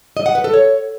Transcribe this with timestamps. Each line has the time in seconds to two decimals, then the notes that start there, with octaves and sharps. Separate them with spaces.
0.17 D#5
0.26 F#5
0.35 B4
0.44 A4
0.54 C#5